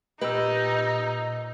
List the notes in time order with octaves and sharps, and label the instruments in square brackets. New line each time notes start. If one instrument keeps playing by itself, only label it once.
[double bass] A#2 [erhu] D#4 [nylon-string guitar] G4 B4 [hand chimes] D#5 E6